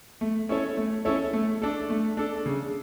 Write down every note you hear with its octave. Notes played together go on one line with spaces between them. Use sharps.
A3
C#4 E4 A4 C#5
A3
C#4 E4 A4 C#5
A3
D4 A4
A3
D4 A4
C#3